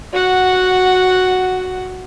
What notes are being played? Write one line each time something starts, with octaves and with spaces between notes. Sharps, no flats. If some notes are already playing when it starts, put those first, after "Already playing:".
F#4 F#5